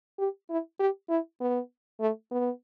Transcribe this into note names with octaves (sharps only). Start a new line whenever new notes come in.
G4
E4
G4
E4
B3
A3
B3